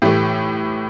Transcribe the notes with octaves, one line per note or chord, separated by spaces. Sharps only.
A2 E3 A3 G4